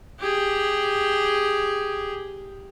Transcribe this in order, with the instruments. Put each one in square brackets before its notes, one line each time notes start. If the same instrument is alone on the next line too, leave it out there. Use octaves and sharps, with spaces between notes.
[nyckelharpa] G4 G#4